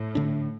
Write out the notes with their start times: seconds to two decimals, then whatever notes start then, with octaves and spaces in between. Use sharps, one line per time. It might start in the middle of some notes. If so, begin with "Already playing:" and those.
Already playing: A2
0.15 D3 A3 D4